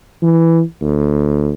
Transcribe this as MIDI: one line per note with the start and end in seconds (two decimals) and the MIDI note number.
0.22 0.62 52
0.81 1.54 38